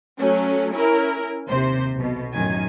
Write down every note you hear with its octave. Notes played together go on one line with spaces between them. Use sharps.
F#3 A3 C#4
C#4 E4 A#4
D#2 C3 C5
B1 B2
A1 F#2 D#3 G#5